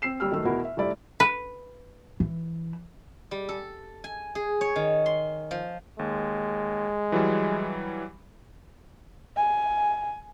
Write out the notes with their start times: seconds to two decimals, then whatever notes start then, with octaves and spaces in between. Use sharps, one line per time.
0.02 C4 E6 C7 E7
0.20 D#2 G3 E6 F6
0.31 F#2 D#3 A3 E6
0.45 E2 B2 E4 A#4 F#5
0.64 E5
0.77 F1 G2 A3 E4 D5 E5
1.20 B4
2.20 E3
3.31 G3
3.49 A4
4.04 G#5
4.35 G#4
4.61 C#5
4.76 D#3
5.06 C6
5.51 F3
5.99 D#2 G#3
7.12 E3 F#3 G3
9.36 G#5